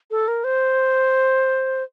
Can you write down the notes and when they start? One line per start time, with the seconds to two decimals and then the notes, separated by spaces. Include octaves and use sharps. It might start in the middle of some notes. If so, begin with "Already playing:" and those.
0.11 A4
0.28 A#4
0.44 C5